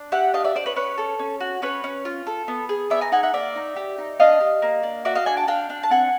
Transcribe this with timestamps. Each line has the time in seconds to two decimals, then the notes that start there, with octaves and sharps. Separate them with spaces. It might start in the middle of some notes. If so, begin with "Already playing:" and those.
Already playing: D4
0.12 G4 E5 F#5
0.34 D4 D#5 F5
0.44 D5 E5
0.55 D4 C5 D5
0.66 B4 C#5
0.76 C#4 B4 C#5
0.98 A4
1.19 C#4
1.40 F#4
1.62 C#4 B4 C#5
1.84 C#4
2.05 F4
2.27 A4
2.48 B3
2.69 G#4
2.90 B3 D5 E5
3.01 G#5 A#5
3.12 D#4 F#5 G#5
3.23 E5 F#5
3.33 A#3 D5 E5
3.56 D#4
3.76 G4
3.98 D#4
4.20 D4 D#5 F5
4.41 G4
4.62 A#3
4.83 D4
5.05 F#4 D5 E5
5.15 D#5 F5
5.26 D4 F#5 G#5
5.37 G5 A5
5.48 D4 F5 G5
5.70 D4
5.83 A5
5.90 C4 F#5 G#5